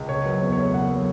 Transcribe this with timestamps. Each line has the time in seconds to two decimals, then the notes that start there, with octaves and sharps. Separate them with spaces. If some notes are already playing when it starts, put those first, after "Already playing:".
Already playing: C#2
0.09 C#3 C#5
0.25 F#3 B4
0.41 E2 C#5
0.52 C#5
0.57 A3
0.63 C#5
0.74 C#3 F#5
0.90 F#3 C#5